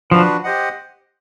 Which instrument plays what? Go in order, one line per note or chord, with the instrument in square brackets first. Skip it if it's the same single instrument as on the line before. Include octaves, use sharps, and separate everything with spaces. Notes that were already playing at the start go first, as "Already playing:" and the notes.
[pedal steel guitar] F3 [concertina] D4 F#4 B4
[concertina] G4 C5 D#5 F#5